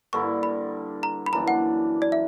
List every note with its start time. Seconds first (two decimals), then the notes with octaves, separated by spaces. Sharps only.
0.13 G2 D3 A#3 E4 C#6
0.43 B5
1.03 A#5
1.26 B5
1.33 F#2 E3 A#3 D4 A#5
1.48 F#5
2.02 D5
2.12 E5